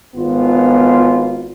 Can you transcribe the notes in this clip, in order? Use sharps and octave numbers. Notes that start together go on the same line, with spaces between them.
G#1 B3 F4